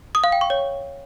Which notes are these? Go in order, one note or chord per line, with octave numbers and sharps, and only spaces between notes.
D#6
F5
G5
C#6
C#5